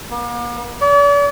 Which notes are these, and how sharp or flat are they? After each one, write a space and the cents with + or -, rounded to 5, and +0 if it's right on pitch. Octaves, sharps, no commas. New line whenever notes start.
A#3 +45
D5 -45